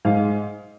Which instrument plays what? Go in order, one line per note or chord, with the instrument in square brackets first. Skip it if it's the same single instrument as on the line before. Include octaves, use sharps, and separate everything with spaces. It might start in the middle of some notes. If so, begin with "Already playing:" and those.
[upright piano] G#2 F5